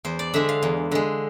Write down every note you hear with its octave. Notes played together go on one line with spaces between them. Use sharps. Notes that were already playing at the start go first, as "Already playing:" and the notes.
E2 C5
D5
D3 G#3 E5
F5
E2
D3 G#3